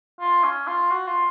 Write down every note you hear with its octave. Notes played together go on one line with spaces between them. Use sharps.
F4
C#4
F4
F#4
F4